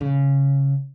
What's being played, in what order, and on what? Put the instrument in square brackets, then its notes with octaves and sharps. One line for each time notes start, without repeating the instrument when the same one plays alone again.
[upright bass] C#3